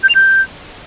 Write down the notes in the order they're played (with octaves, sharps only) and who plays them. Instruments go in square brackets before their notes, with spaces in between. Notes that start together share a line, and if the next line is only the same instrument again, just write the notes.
[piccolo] G6
F7
G6